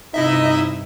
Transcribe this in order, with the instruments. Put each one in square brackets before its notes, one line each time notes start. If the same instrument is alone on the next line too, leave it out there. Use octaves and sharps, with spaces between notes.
[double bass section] G2 C3 [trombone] D#4 [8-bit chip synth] E4 D#5 E5